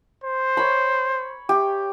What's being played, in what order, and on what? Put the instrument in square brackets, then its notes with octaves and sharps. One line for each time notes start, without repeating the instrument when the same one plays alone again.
[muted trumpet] C5
[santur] C#5 B5
G4